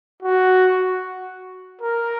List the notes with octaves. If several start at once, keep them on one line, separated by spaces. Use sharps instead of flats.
F#4
A#4